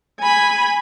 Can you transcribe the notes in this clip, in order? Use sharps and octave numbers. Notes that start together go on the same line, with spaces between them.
G#5 B5